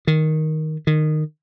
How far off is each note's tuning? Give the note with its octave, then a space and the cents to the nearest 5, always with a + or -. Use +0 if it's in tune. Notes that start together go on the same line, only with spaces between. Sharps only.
D#3 +5
D#3 -15